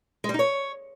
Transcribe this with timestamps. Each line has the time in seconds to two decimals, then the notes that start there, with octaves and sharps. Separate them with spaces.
0.24 G#3
0.29 G3
0.34 D#4
0.39 C#5